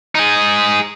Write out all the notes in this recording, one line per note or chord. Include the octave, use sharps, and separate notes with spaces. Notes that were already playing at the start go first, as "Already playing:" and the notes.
D#4 G#4